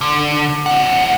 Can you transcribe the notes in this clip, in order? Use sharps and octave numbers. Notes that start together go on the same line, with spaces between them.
D3
A2 F#5